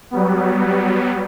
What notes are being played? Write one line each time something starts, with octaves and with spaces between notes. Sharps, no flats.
F#3 G3 B3